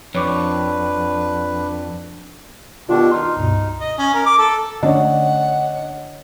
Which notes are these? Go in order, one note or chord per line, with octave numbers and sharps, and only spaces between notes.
F2 D4 B4 C#5 C#6 D6
B2 D#3 D4 F4 G4
D#4 C6 F6
C#2 G2 B2
D#5
C#4
A#4
D6
A4
D3 A3 C#4 D4 C#5 D#5 F#5